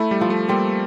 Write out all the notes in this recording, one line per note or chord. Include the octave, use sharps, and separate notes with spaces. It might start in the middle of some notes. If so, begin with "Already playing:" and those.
Already playing: A3 E4
G3
F3
A3
G3 A#3 C4